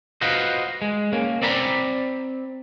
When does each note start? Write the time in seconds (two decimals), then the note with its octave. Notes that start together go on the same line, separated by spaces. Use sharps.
0.21 F4 F#4 B4 C5 D#5
0.82 G#3
1.13 A#3 C#4
1.42 C4 D5 A#5 B5